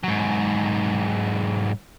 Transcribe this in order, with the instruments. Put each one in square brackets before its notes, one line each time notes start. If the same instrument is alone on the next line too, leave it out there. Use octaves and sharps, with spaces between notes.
[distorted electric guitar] G#2 F#3